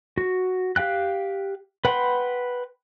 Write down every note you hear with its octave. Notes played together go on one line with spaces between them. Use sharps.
F#4
G4 F5 G5 F#6
B4 F#5 G5 B5 C6